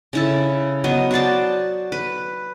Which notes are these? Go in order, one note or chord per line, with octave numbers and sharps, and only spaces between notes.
C#3 E4 A4
F#3 B3 F#4 D#5
F#4 C5 D5 A5
B4